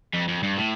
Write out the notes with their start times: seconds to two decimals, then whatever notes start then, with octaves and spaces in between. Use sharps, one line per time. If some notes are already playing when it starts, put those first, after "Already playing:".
0.13 F2
0.28 F2
0.43 G2
0.58 A2